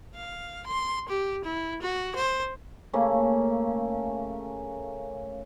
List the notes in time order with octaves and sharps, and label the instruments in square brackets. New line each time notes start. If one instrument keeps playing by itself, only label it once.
[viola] F5
C6
G4
E4
F#4
C5
[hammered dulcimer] C#3 A3 A#3 C#4